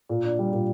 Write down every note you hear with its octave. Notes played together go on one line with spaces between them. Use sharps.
A#2
D4
G3
A#2